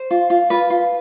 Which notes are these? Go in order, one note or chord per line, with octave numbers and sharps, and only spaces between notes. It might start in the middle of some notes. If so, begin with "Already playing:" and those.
Already playing: C5
F4
F4
F4 B4
F4